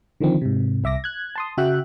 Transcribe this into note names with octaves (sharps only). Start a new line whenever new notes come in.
D3 D#3 F3 C4
G#2 C3
C2 E5 D6 A#6
F#6 G#6
A5 C6 D#6
C#3 F#4 E5 G5 F#6